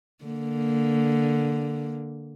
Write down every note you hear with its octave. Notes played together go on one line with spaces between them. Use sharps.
D3 A#3